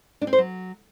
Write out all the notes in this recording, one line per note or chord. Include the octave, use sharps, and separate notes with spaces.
D4
C4
C5
F#3